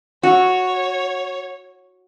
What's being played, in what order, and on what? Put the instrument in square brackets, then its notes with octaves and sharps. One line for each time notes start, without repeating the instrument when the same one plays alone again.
[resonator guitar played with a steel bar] F#4 [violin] C#5